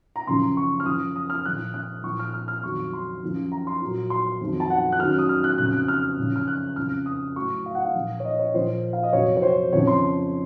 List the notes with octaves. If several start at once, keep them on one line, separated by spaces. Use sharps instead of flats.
A#5
F#2 C#3 F3 C6
C#6
F6
F#2 F3 D#6
D#6
F6
A#2 F3 F#6
F#6
A#2 F3 C#6
F6
F6
F6
F2 D#3 F#3 C#6
C6
F#2 F3
A#5
C6
A#2 F#3
C6
F2 D#3 F#3
A5
F#5
F#6
F#2 D#3 F#3 F6
D#6
F6
F#6
F2 C#3 F#3 F#6
F#6
F6
F#2 C#3 F3
F6
F#6
F2 C#3 F3 F6
D#6
A2 F#3 C#6
F5
F#5
F5
A#2 F3
C#5
D#5
C#5
A#2 F3 C5
F5
D#5
F2 C3 F#3 C#5
C#5
C5
F2 C#3 F3 C#5
C6